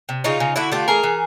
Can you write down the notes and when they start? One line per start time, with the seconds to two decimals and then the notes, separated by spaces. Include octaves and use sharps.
0.09 C3
0.24 C#3 D#4 F4
0.40 C#3
0.56 D3 E4 F#4
0.72 A3 F4 G4
0.88 E3 G#4 A#4
1.03 E3